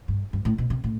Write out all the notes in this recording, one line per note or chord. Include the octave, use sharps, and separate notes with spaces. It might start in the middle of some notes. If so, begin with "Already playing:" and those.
G2
G2
A2
B2
C3
A2